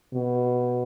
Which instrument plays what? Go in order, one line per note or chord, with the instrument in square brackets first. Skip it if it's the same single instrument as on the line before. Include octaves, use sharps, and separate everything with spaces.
[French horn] B2